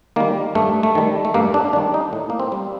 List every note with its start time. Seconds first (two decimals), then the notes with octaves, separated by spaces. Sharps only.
0.16 D#3 G3 A#3
0.55 G2 A3
0.83 A3
0.95 D#3 G3
1.25 A3
1.34 G2 A#3
1.54 D4
1.73 D#3 G3 D4
1.94 D#4
2.13 A2
2.30 A#3
2.40 C4
2.52 G3